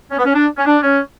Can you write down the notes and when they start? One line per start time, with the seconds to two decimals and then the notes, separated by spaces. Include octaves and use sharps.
0.11 C#4
0.18 B3
0.25 C#4
0.35 D4
0.57 C#4
0.66 D4
0.82 C#4